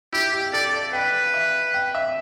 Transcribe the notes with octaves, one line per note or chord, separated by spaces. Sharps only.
E4 G4
G4
A4 D5
D5
B4 G5
E5
G5
E5